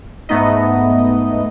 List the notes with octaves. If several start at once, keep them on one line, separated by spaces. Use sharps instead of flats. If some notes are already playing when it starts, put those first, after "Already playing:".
G#2 A3 B3 D#4 D#5